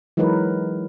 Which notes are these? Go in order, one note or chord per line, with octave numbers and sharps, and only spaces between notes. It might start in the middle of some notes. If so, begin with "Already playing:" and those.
E3 F#3 G#3 D#4 A#4 B4